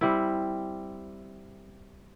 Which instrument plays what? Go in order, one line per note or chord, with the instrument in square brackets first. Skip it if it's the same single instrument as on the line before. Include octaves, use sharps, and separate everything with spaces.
[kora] G3 C4 E4